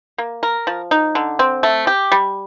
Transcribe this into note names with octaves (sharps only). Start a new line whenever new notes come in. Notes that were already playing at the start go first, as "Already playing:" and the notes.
A#3
A#4
F3
D#4
D3
C4
A3
G4
G3